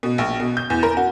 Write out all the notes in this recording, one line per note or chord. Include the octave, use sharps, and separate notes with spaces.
B2
A#1
B2
G6
E2
A#4
F#4